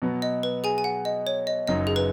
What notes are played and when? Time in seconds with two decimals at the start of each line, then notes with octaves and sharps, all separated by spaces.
0.02 B2 F#3 B3
0.22 D#5
0.43 B4
0.64 G#4 G#5
0.78 G#5
0.84 F#5
1.05 D#5
1.27 C#5
1.47 D#5
1.67 F#1 F#2 F#3 D#4 D#5
1.87 G#4
1.96 B4